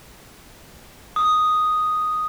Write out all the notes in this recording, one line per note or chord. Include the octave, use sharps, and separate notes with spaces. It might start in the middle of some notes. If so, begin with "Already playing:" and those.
D#6